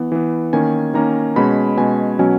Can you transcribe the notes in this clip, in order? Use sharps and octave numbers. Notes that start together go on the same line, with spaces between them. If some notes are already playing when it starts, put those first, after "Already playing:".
Already playing: E3 B3
E3 B3
D#3 A#3 C#4 G#5
D#3 A#3 C#4 A#5
B2 G#3 C#4 B5
B2 G#3 C#4 G#5
B2 F#3 C#4 G#5